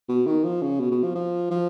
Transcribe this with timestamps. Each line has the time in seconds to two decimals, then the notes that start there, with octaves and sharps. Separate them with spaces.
0.09 B2
0.27 D#3
0.44 F3
0.62 C#3
0.80 B2
0.91 B2
1.04 F3
1.15 F3
1.51 F3